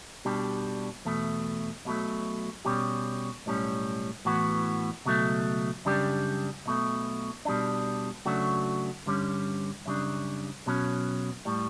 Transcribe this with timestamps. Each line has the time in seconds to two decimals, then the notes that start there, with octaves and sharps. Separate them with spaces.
0.25 B2 G3 D4 G4
1.05 E2 B2 A3
1.85 B1 B2 F#3 A3
2.65 B2 G3 C#4 G4
3.46 B1 A2 G3 C#4
4.25 A2 E3 B3 F#4
5.05 C#2 B2 F#3 A3
5.85 F#2 C#3 G3 D4 G4
6.66 B1 B2 A3
7.45 B2 G3 D4
8.25 C#3 F#3 A3 D4 F#4
9.06 G2 D3 G3 C#4
9.86 F#2 C#3 G3 D4
10.66 B1 B2 F#3 C#4
11.45 A2 G3